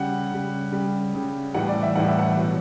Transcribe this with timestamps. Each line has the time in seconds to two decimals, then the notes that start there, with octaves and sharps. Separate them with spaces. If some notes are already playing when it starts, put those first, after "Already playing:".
Already playing: C#3 G3 F#5
0.31 C#3 G3
0.72 C#3 G3
1.14 C#3 G3
1.54 A2 E3 G3 F#5
1.68 D5
1.83 E5
1.95 A2 E3 G3 F#5
2.08 E5
2.19 F#5
2.37 B2 F#3